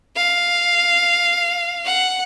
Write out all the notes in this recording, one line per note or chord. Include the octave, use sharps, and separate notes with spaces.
F5
F#5